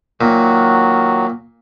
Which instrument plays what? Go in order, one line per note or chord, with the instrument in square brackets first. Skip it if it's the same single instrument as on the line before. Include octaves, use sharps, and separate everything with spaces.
[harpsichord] A#2 [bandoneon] D#3 F#3 F#4